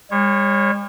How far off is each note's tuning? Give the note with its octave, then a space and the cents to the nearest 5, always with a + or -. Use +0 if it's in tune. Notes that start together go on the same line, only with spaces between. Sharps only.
G3 +45 C#5 -25